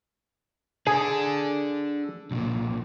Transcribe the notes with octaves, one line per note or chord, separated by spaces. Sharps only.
D4 G#4 A4
B1 A#2